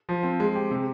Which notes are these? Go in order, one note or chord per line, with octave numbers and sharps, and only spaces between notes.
F3
C4
G#3
G4
C3